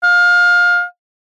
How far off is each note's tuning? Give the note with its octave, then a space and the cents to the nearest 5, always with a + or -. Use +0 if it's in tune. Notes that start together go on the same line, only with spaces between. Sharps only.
F5 +25